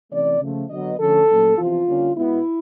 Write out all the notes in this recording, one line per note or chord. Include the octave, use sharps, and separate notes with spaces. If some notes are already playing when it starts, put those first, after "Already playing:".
C3 E3 A3 C#4 D5
C#3 F3 A3
D3 F#3 B3 D#5
D3 F3 A3 C#4 A4
A#2 F#3 A3 C#4
E2 C3 F3 F4
D3 G3 A#3 C#4
B2 G#3 B3 E4